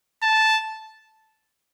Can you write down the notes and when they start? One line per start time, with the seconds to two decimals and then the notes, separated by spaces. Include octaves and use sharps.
0.22 A5